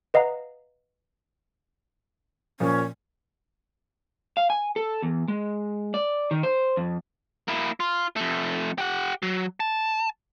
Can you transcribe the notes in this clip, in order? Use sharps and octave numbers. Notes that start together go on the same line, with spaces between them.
B4 D#5 F5 F#5 A#5
A#2 F3 C#4
F5
G#5
A4
E2
G#3
D5
D#3
C5
F2
A#3 E4
F4
F2 A3
G4 F#5
F#3
A5